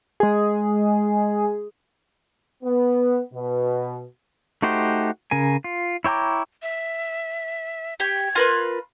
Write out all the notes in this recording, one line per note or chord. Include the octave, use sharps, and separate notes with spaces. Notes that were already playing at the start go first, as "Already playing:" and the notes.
G#3 G#4
B3
B2
A3 D#4 F#4 G4 C5
C#3 A#4 G#5
F4
E4 C#5 G5 A#5 D6
E5
G4 G#6
F4 A#4 B4